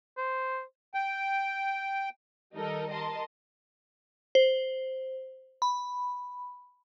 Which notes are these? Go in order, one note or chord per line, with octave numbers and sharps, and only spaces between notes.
C5
G5
D#3 G3 D#4 A4 A#4 D#5
A#4 D#5 A5 C6
C5
B5